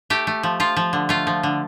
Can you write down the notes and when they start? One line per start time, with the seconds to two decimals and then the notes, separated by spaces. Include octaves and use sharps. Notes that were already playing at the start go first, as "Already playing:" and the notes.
0.10 A3 G4
0.27 A3
0.43 F3
0.60 F3 F4
0.76 F3
0.93 D3
1.09 A3 F4
1.27 F3
1.43 D3